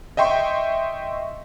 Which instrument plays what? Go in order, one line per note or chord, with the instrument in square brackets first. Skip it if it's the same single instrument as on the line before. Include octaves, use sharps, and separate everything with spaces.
[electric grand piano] D#5 E5 G5 C6 C#6